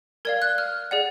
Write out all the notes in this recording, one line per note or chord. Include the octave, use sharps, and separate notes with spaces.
A#4 D5 F5 G#6
F#6
F6
G#4 D5 F#5